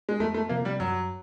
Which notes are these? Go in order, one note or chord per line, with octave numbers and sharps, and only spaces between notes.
G#3
F2 A3
A3
C3 F3 A#3
G3
F#2 F#3